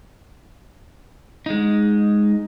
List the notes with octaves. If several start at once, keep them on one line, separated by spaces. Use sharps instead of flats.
G#3 D#4